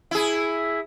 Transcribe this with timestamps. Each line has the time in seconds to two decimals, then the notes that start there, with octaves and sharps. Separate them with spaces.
0.11 E4 G#4